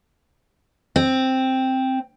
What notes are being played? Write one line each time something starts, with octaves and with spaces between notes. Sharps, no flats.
C4